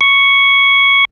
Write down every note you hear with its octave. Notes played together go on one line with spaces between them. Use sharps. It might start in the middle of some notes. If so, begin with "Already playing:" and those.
C#6